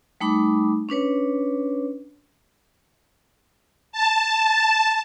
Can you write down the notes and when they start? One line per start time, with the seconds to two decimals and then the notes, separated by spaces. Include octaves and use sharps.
0.21 G3 A3 D#4 B5 D6
0.89 C#4 D4 B4 C#5
3.92 A5